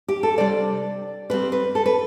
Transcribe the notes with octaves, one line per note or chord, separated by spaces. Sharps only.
G4
A4
C3 G3 D4 D5
D3 G3 C4 B4
B4
A4
B4